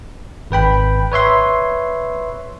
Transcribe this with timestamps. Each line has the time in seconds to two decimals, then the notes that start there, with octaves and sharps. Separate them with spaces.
0.51 G#1 B4 G5 B5
1.12 B4 C#5 E5 C6